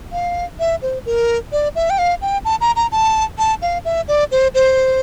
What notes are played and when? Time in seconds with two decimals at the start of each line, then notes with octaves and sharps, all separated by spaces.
0.12 F5
0.59 E5
0.82 C5
1.06 A#4
1.52 D5
1.76 E5
1.90 G5
1.98 F5
2.22 G5
2.45 A5
2.61 A#5
2.76 A#5
2.92 A5
3.38 A5
3.62 F5
3.85 E5
4.08 D5
4.31 C5
4.55 C5